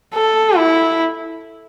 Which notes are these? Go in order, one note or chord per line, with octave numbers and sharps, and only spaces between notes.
A4
E4